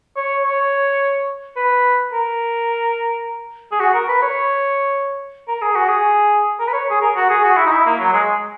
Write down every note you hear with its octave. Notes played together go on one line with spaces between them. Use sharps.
C#5
C#5
B4
A#4
G#4
F#4
A#4
B4
C#5
A#4
G#4
F#4
G#4
A#4
B4
C#5
G#4
A#4
F#4
G#4
F#4
E4
D#4
E4
A#3
F#3
G#3